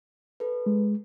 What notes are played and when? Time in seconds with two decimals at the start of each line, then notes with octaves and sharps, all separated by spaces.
0.40 A4 B4
0.66 G#3